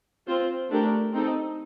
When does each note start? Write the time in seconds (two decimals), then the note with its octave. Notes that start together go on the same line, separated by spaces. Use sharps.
0.27 C4 F4 C5
0.69 A3 D4 G4 A#4
1.12 C4 D#4 A4